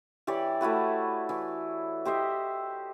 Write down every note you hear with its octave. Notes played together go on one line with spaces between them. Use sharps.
E3 G4 C#5 D5
A3 E4 F#4 B4
E3
G4 C5 D#5 E5